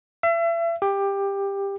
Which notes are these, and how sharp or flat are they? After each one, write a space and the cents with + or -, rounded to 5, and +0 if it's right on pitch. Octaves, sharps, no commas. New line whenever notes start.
E5 +35
G4 +15